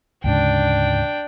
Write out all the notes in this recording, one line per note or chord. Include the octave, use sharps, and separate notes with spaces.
D2 G#2 C#3 D4 G5